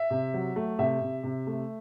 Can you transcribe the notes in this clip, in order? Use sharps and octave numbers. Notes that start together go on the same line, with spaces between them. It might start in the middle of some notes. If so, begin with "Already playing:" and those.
Already playing: E5
C3
F#3
A3
C3 E5
C3
C3
A3